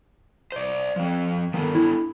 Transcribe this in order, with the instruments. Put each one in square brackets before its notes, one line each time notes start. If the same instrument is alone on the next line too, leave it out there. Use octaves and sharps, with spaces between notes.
[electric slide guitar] C5 D5
F3 C4
[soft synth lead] D#3 [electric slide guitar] B3 D4 A4
[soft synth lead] E4